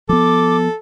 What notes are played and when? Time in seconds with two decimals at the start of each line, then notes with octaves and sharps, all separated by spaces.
0.09 F3 B3 A4 D6